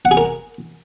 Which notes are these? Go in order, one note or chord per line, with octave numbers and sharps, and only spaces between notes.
F#5
G#4
A#4